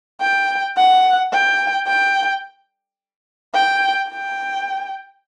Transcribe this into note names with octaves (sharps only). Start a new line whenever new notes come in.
G5
F#5
G5
G5
G5
G5